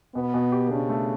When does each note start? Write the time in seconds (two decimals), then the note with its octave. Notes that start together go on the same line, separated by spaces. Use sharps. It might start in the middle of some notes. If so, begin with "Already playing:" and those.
0.15 B2 B3
0.34 B2
0.52 G4
0.71 C#3 D4
0.89 A3